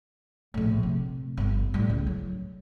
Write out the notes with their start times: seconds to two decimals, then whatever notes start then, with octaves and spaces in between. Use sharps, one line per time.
0.54 A#1 A2
0.83 C3
1.37 G1 G2
1.74 A2 G3
1.90 C#2
2.07 F#3